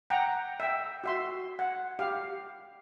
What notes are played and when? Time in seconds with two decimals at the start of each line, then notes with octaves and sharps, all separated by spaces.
0.10 F#5 G5 A#5
0.60 E5 G5
1.04 F#4 E5 C6
1.59 F#5
1.99 G4 F5